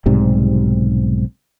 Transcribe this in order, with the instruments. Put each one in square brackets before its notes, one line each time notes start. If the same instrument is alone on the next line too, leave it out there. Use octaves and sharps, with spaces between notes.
[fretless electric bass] B1 G#2 C3 G3